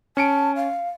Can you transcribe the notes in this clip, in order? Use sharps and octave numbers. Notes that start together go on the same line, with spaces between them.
C#4 A5 C#7 D7
F5